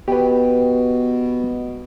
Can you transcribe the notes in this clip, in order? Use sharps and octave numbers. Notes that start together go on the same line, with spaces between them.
B2 G4 B4